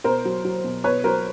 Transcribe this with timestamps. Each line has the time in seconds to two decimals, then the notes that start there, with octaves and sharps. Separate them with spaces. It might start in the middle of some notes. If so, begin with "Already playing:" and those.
0.04 B2 A#4 C5
0.25 F#3
0.45 F#3
0.64 B2
0.84 B2 B4 C#5
1.04 F#3 A#4 C5